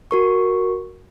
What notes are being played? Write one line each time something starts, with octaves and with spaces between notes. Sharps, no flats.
F#4 A#4 C#6